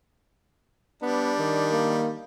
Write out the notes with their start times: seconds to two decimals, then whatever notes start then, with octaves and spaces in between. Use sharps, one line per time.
1.02 G3 B3 D4
1.39 D#3
1.72 A#3